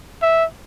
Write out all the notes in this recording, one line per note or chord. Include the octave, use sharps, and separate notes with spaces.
E5